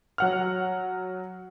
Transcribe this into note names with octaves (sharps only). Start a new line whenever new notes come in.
F#3 F#5 F6